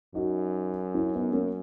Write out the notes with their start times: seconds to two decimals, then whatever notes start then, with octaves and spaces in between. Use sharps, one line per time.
0.15 F#2 D#4 F#4
0.95 C#4 E4
1.13 B3 D#4
1.33 A#3 C#4